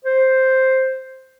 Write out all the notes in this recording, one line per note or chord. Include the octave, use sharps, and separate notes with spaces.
C5